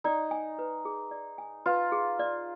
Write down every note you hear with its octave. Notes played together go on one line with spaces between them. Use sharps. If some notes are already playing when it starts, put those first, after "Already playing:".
D#4 D5
G#5
B4
G#4
D5
G#5
F4 B4
G#4
D5